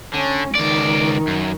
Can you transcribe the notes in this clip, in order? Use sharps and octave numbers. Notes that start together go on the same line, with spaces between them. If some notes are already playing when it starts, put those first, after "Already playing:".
D3 C#4
C#2 D#3 D5
F#2